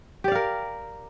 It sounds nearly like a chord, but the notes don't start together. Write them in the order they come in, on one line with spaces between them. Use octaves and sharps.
G4 D5 F5 A#4